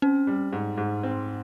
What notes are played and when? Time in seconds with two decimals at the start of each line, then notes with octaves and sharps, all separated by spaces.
0.02 C4 C#4
0.27 G3
0.53 G#2
0.78 G#2
1.03 C4